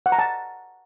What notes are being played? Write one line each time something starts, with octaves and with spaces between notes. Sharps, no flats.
F#5
A#5
A5